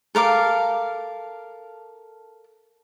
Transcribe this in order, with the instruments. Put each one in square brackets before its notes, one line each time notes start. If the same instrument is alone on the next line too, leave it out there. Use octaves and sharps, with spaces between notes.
[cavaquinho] A4 A#4 F5 D6